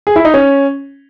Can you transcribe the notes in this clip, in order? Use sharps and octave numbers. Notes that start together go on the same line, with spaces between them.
G#4
E4
D#4
C#4